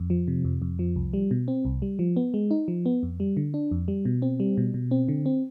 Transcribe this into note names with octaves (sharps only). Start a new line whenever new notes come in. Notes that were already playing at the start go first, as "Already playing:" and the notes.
Already playing: F2
F3
C3
F2
F2
F3
C2
G3
B2
C4
C2
G3
F3
B3
G#3
D#4
F3
B3
F2
G3
D3
D4
F2
G3
B2
C4
G3
B2
B2
C4
D3
C4